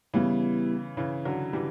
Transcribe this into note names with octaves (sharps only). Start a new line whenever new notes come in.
C#3 E3 G3 B3 E4
C#3 E3
D3 F#3
E3 G3